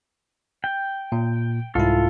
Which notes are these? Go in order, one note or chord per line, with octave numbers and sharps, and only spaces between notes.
G5
A#2
C2 G#2 E4 F4 A4